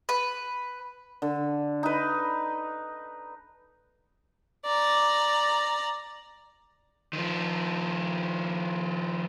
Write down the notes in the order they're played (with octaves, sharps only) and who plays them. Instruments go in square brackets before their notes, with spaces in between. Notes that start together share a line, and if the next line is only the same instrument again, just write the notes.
[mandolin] B4
[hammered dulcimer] D3
D#4 B4
[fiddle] D5 A#5
[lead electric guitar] D#3 F3